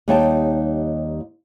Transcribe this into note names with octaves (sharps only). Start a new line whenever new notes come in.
D#2 G3 D#4 C#5 G5 A5